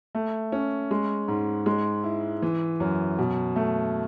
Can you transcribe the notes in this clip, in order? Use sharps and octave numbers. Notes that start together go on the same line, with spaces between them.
A3
C#4
G#3
G#2
G#3
E4
E3
F#2
B2
A3